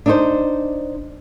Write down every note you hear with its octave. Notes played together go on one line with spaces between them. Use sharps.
D4 D#4 C5